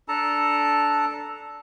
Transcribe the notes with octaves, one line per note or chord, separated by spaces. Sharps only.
D4 A4 A5 A#5